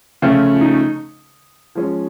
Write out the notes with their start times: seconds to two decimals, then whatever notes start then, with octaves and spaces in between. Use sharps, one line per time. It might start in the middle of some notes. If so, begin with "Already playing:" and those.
0.22 C#3 F3 A3 C#4 F4
0.61 D#4
1.75 F3 G#3 C#4